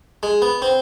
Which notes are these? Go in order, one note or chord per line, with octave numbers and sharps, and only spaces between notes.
G#3
B3
C4